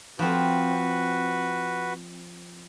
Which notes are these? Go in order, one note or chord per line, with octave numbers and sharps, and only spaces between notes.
F3 C4 F#4 B4